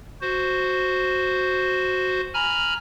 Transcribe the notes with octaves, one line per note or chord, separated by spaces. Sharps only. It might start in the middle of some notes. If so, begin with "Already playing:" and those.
F#4 C5
G#5 A#5 B5 F6